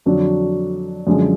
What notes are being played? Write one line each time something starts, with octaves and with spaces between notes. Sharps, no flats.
F2 D3 F#3 D4 F#4
F#2 D3 F3 G#3